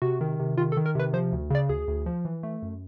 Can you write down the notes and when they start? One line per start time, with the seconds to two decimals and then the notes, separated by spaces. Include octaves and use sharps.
0.02 C3 F#4
0.21 D#3
0.40 C3
0.58 D#3 F4
0.72 A4
0.77 D#3
0.86 A#4
0.95 C3 B4
1.14 F3 C5
1.32 D2
1.50 C#3 D5
1.69 D2 G#4
1.88 D2
2.06 F3
2.25 E3
2.43 A3
2.62 F#2